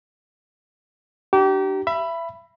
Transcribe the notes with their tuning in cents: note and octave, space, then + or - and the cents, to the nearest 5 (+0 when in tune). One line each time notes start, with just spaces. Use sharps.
D4 +25 G4 -30 A#5 +0
E5 +25 B5 +0